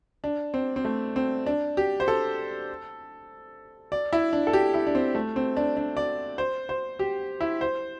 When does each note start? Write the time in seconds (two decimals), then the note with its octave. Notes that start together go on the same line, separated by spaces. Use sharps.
0.24 D4
0.54 C4
0.76 C4
0.85 A3
1.16 C4
1.46 D4
1.77 G4
2.00 C5
2.08 A4
3.92 D5
4.13 E4
4.33 D4
4.47 A4
4.53 G4
4.74 E4
4.87 D4
4.95 C4
5.15 A3
5.36 C4
5.57 D4
5.77 D4
5.97 D5
6.38 C5
6.69 C5
6.99 G4
7.41 E4
7.61 C5